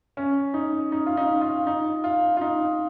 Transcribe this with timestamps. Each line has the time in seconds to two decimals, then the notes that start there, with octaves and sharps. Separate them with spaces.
0.17 C#4
0.54 D#4
0.92 D#4
1.06 F4
1.17 D#4
1.41 F4
1.67 D#4
2.04 F4
2.37 F4
2.41 D#4